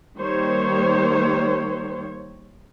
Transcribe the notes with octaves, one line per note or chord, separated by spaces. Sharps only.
D#3 G3 A#3 C5 C#5